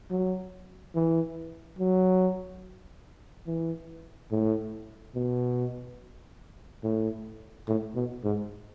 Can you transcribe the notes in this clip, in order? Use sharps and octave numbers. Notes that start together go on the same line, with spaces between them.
F#3
E3
F#3
E3
A2
B2
A2
A2
B2
G#2